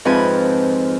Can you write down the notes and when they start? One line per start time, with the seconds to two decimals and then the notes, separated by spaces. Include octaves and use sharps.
0.05 F2 G#2 F3 B4 G#5